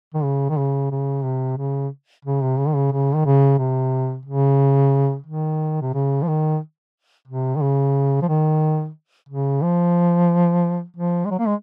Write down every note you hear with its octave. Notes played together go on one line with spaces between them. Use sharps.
D#3
C#3
D#3
C#3
C#3
C3
C#3
C#3
C3
C#3
D#3
C#3
C#3
D#3
C#3
C3
C#3
D#3
C3
C#3
F3
D#3
C3
D#3
C#3
F3
D#3
C#3
F3
F3
G#3
F#3
A#3
G#3